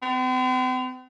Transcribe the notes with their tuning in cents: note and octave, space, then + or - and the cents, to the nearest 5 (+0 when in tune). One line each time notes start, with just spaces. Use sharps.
C4 -45